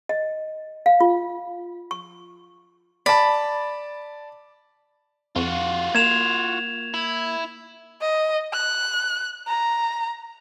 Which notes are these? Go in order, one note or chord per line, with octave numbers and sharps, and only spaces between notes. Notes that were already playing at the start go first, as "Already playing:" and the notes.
D#5
F5
F4
C#6
D5 A5 B5
F2 F4 F#4
A#3 G#6 E7 F7
E4
D#5
F#6
A#5